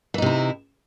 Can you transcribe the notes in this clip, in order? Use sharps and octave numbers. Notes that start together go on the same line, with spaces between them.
C3 E3 D#4 E4